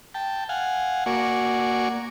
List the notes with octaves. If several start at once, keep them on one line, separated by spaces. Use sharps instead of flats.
G5 A5
F5 F#5 G#5
A#3 F#4 D5 G#5 C#6